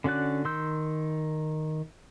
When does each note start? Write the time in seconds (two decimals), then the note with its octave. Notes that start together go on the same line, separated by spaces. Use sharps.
0.04 D3 C#4 F#4 D5 F#6
0.45 D#3 C6 E6 G6